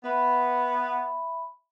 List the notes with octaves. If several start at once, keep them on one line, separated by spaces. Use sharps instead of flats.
B3 E5 B5